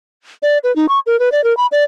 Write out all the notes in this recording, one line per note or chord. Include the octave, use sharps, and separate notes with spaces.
D5
B4
D#4
C#6
A#4
B4
D5
A#4
B5
D5